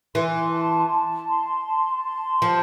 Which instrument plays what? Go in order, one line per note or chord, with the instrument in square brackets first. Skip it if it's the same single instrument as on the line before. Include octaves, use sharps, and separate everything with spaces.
[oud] E3 [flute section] C6
[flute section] A5
A5
C6
A5
C6
[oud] F3 [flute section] A5